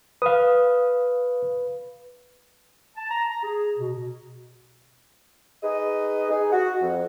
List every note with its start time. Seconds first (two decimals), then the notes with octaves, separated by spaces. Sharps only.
0.22 B4 F5 D#6
2.96 A5
3.10 A#5
3.29 A#5
3.43 G#4
3.77 B2
5.63 D#4 G#4 B4 D#5
6.31 D#4 G#4
6.51 F#4
6.81 F2